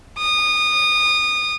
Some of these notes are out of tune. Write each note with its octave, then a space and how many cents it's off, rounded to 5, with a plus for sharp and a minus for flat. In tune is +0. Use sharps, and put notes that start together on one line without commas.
D#6 -25